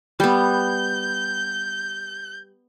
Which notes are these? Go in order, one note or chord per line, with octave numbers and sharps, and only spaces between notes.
G3 B3 G6